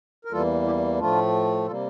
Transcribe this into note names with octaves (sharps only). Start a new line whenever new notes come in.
A#4
E2 E3 G3 A#3 F4 A4
E4 G4
A2 F3 A3 D4 F4
C3 G3 A#3 F4 A4